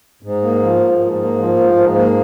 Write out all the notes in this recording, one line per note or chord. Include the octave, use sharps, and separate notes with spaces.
G#2
A#3
F3
G#2
G#2
A#3
F3
G#2
G#2
A#3